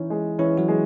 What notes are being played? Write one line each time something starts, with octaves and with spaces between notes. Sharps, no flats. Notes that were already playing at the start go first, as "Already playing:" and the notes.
Already playing: E3 C#4 D#4 E4
G#3
E3 C#4 E4
F#3 F#4
G#3